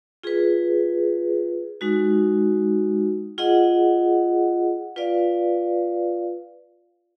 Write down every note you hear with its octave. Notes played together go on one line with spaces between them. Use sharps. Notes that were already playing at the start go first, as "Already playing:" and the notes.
F4 G#4 B4
G#3 D#4 F#4
F4 G#4 D#5 F#5
F4 B4 D5 F5